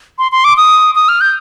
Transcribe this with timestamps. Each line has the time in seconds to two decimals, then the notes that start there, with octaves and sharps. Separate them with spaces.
0.18 C6
0.32 C6
0.44 D6
0.57 D#6
0.95 D#6
1.09 F6
1.21 G6